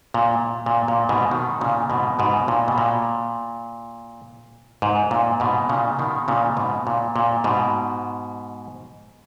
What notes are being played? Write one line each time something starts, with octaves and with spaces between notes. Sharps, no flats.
A#2
A#2
A#2
G#2 B2
B2 D#3
A#2 C#3
G#2 B2
G#2 B2
A#2
B2
A#2
G#2
A#2
G#2 B2
A#2 C#3
B2 D#3
A#2 C#3
G#2 B2
A#2
A#2
G#2 B2